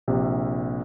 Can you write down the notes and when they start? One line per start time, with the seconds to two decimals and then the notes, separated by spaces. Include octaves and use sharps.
0.08 A#1 C3